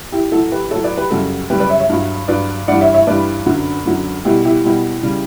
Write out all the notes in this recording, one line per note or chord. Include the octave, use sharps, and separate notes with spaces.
E4 G4
A2 F#3 F#4 A4
G4 B4
A2 F#3 A4 C#5
B4 D5
G4 B4
F#2 C#3 G3 F#4 A4
F#2 C#3 G3 G4 B4
B4 D5
C#5 E5
C#5 E5
G2 F#3
G2 F#3 B4 D5
G2 E3 G3 D5 F#5
C#5 E5
C#5 E5
G2 E3 G3 B4 D5
F#2 D3 F#3
F#2 D3 F#3
B2 G3 E4 G4
E4 G4
B2 G3 E4 G4
C#3 G3